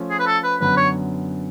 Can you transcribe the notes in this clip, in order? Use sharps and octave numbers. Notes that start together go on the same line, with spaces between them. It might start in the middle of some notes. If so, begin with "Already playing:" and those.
Already playing: F3 A3 C#4 F4
G#4
B4
A4
B4
F#2 D3 F#3 B3 B4
C#5